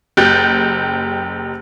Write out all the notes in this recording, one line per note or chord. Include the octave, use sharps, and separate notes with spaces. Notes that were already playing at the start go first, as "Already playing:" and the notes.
F#1 G4 F#6 G6 A6